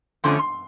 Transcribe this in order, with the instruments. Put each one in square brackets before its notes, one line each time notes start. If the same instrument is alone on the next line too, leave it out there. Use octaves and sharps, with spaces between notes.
[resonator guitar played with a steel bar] F2 D3 F3 A3 C#4 [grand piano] C6
[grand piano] C6